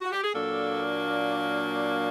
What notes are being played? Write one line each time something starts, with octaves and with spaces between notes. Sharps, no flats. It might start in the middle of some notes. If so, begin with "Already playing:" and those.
F#4
G4
G#4
A#2 F#3 A#3 D4 A4